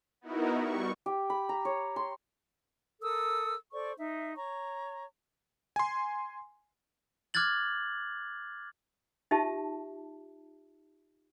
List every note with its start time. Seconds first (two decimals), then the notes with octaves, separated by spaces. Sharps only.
0.21 B3 D#4 E4 F#4 A#4
0.59 G3 C#6
1.06 G4
1.30 B5
1.49 A#5
1.65 C#5
1.96 C6
3.01 A4 A#4 D#6 E6
3.72 A4 C5 D5 C#6
3.97 D#4 E5
4.36 C#5 A#5 C#6
5.76 G#5 C6
7.34 D6 F6 F#6 G#6 A6 F#7
9.31 D#4 F4 G4 E5 A5